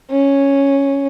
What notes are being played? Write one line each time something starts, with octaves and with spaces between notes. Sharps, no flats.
C#4